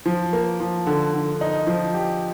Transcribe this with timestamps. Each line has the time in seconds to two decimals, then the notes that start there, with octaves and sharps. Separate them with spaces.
0.06 F3
0.33 A#3
0.60 F3
0.86 D3
1.14 D3
1.41 D#4
1.67 F3
1.94 G4